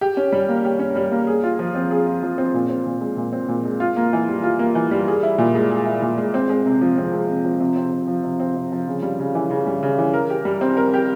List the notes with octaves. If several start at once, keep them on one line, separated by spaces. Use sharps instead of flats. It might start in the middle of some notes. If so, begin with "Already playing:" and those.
G4
C#4
G3
A#3
G4
C#4
G3
A#3
G#4
F4
F3
C4
G#4
F4
F3
C4
A#2
C4
A#2
G#3
A#2
C4
A#2
G#3
F4
A#3
E3
G3
F4
A#3
E3
G3
G#4
E4
A#2
G#3
G#4
E4
A#2
G#3
C4
G#3
C3
F3
C4
G#3
C3
F3
C3
C4
C3
F3
C3
C4
C3
F3
C#3
G3
C#3
E3
C#3
G3
C#3
E3
A#4
G4
G3
C4
A#4
G4